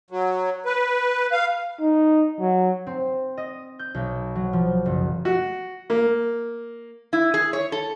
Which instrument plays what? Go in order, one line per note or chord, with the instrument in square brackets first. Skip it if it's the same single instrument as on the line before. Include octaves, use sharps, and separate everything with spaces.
[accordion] F#3
B4
F5
[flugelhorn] D#4
F#3
[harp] C4
D#5
G6
B1
F#3
F3
F#1
[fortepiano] F#4
A#3
[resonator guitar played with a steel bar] E4
G#4
C#5
A4